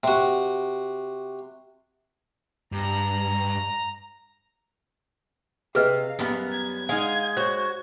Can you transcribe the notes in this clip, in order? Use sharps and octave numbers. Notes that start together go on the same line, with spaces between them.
C3 F#4
G2 A#5
C3 G#4 B4 D#5 F5
F#2 G3 B3 A#4
G#6
G#3 D#4 F5 F#5
F#4 C5 C#5